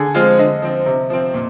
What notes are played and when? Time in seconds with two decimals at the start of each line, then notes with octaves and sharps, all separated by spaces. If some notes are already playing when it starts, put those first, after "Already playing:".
Already playing: D3 G#4
0.15 F3 G#3 C4 F4
0.39 D3 D#5
0.62 F3 C4
0.86 C3
1.10 F3 C4
1.34 A#2